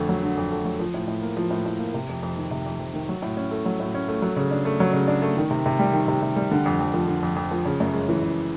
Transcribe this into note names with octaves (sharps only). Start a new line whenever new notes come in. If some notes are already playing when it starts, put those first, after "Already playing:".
Already playing: F2 D3 A3
F#3
D3
F2
A3
F#3
F3
A2
A2
A#3
F3
A2
A2
A#3
C3
F2
F2
D#3
C3
F2
F2
D#3
F#3
A2
C#4
A3
F#3
A2
C#4
A3
F#3
C#3
D4
A3
F#3
C#3
D4
A3
D#3
C3
C3
G3
D#3
C3
C3
G3
D3
F2
F2
F3
D3
F2
F2
F3
C#3
F#2
G#3
E3
C#3